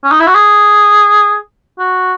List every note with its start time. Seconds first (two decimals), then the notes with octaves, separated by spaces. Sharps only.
0.04 C#4
0.11 D#4
0.20 E4
0.27 F#4
0.35 G#4
1.79 F#4